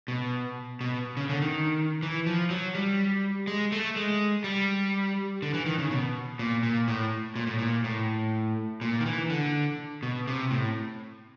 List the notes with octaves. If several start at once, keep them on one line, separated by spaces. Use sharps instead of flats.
B2
B2
C#3
D3
D#3
E3
F3
F#3
G3
G#3
A3
G#3
G3
D3
E3
D#3
C#3
B2
A#2
A#2
A2
A#2
A2
A#2
A2
A#2
D#3
E3
D3
B2
C3
A2